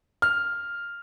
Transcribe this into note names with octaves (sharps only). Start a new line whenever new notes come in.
F6